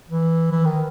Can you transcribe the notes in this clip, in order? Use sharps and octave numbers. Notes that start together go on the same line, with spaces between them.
E3
E3
D#3